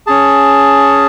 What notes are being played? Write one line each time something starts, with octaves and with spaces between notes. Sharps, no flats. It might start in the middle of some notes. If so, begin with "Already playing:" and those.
C#4 G#4 A5